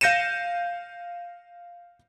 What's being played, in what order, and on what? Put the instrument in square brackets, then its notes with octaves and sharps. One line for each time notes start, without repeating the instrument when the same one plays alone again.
[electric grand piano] F5 G6 A#6 C#7 D#7 E7